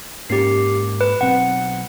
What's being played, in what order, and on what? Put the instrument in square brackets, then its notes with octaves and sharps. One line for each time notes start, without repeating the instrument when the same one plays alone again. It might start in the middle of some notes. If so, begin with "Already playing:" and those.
[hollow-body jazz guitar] G#2 A#3 C#4 [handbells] G4 C7
[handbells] B4
[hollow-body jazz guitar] B1 C4 [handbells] F#5